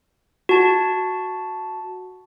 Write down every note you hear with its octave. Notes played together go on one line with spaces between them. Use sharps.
F#4 A5